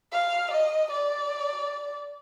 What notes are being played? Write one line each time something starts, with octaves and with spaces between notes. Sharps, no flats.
F5
D#5
D5